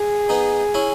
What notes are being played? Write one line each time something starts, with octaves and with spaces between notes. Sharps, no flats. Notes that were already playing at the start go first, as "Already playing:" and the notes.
Already playing: G#4
B3 D#4
C#4 E4